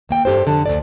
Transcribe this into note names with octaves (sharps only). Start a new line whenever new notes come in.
D#2 A#3 G5
G2 D#3 G4 A4 C5
F2 D3 A5
D2 B2 D5